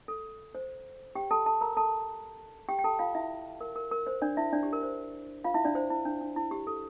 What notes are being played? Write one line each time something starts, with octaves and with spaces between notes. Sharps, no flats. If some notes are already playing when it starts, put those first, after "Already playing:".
A4
C5
G4 G5
A4 A5
A4 A5
A#4 A#5
A4 A5
G4 G5
G5
A4 A5
F4 F5
E4 E5
A#4
A#4
A#4
C5
D4 D5
E4 E5
D4 D5
G4
A#4
C5
F4 F5
E4 E5
D4 D5
C5
E4
D4
D4
E4
G4
A4